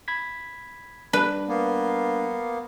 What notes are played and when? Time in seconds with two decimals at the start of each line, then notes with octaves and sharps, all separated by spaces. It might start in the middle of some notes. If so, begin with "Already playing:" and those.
0.08 B5 G#6 B6
1.13 G3 D4 B4
1.49 A#3 B3